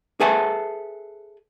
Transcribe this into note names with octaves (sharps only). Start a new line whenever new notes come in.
G#4 A4 B4 E5 G#5 A5